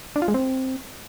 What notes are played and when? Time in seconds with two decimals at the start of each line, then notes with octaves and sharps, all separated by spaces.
0.16 D4
0.22 F4
0.28 G#3
0.34 C4